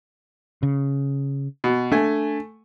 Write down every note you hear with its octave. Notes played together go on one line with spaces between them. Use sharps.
C#3
B2
A3 D4 G#5